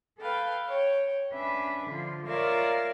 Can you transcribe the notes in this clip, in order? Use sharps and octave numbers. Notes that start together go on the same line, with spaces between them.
A4 B4 F5 G5
C#5 G5
C#4 D4 B4 E5
D3 F3 F4
F4 A#4 C#5 D5 E5 F5